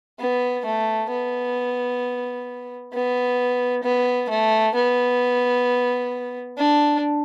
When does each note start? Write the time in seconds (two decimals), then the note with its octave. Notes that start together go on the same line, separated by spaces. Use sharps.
0.19 B3
0.65 A3
1.10 B3
2.93 B3
3.83 B3
4.30 A3
4.75 B3
6.57 D4